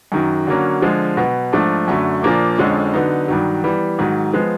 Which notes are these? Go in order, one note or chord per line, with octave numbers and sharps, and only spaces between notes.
F#2 D#3 F#3
D3 F#3 A#3 C#4
D3 F3 G#3
B2 F#3 B3
G#2 F3 A3 D4
F#2 D3 F#3 A3
A#2 F3 A#3 D4
F2 D3 F3 G#3 C#4
D3 F#3 B3 D#4
G2 D#3 F#3
E3 G3 B3
G#2 D#3 F#3
F3 G#3 B3